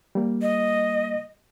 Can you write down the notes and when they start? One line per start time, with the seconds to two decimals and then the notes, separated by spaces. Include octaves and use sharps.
0.15 G3 A#3
0.42 D#5